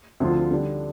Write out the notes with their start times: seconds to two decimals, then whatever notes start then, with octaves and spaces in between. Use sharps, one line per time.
0.20 D2 D3 F3 C4 F4
0.51 D3 G3 D4